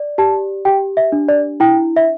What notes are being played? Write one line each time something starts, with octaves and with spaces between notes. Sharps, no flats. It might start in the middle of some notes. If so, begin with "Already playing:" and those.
Already playing: D5
G4 A5
G4 G5
E5
D4
D5
E4 G5
E5